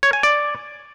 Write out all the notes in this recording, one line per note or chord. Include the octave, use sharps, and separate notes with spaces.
C#5
G#5
D5